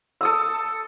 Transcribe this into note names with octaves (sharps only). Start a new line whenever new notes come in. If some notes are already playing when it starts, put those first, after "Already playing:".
A4 D#6 E6